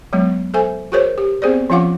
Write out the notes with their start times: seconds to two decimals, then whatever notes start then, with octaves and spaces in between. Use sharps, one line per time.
0.13 F#3 G#3 B3
0.54 A4 C5 E5 G#5
0.92 F#4 G#4 A#4 C5 C#5
1.18 G4
1.42 B3 C4 G#4 C5 D5
1.70 F3 C#4 F4 F5 F#5 D6